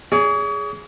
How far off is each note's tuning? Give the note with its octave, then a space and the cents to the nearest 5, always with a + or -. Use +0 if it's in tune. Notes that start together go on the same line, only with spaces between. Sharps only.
G#4 +0 C#5 +45